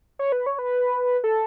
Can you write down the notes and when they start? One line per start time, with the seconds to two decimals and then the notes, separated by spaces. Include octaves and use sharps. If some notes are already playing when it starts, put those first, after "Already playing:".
0.19 C#5
0.32 B4
0.46 C#5
0.59 B4
1.24 A4